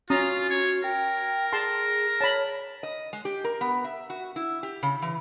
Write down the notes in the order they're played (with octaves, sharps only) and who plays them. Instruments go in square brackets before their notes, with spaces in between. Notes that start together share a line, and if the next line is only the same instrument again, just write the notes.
[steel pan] C#4 A#5 D#6 [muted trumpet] F4 [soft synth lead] F#4
[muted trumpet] C#5
[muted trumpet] A#4 [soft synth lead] G5
[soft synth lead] G#4 [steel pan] A5 C6
[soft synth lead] C#5 [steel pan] A5 B5
[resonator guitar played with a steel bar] D#5
G#3
G4
A#4
B3
E5
F#4
E4
G4
C#3
E3